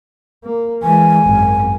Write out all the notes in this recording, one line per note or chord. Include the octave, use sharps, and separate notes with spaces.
A#3
E3 G#3 G#5
G#1 F#2